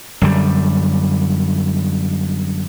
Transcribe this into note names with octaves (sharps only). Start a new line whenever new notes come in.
F#2 D3 G3